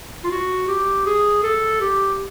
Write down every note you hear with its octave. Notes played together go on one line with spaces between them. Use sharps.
F4
F#4
G4
G#4
A4
G4